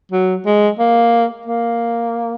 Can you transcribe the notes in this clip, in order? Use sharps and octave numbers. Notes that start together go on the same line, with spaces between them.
F#3
G#3
A#3
A#3